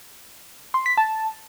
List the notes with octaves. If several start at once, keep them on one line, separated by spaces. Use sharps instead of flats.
C6
B6
A5